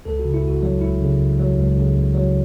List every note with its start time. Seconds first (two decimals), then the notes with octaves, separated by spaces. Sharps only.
0.05 C#2 A4
0.19 F#4
0.25 C#3
0.34 E4
0.43 C#2 F#4
0.63 F#3
0.81 C#2 E4
1.01 C#3
1.20 C#2
1.39 F#3
1.57 C#2
1.77 C#3
1.97 C#2
2.15 F#3